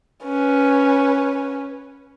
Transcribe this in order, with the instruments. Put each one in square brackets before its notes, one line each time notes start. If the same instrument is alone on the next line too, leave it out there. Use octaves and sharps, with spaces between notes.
[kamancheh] C#4 B4